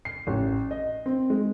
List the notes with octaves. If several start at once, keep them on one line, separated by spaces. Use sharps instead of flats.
C7
A1
D#5
C4
G#3